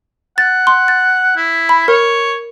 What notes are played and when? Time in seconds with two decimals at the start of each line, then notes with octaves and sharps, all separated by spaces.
0.38 F#5 A6
0.67 C6
0.88 A6
1.37 E4
1.69 B5
1.88 A#4 C#5